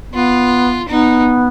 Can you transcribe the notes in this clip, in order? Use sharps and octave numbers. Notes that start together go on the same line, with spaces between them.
B3 F4
B3 D#4